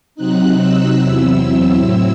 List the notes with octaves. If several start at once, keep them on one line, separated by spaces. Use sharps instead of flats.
C3 F#3 C4 D#4 F#6
E6
E2 C3 F#3 C4 E4
A2 F#3 C4 E4 E6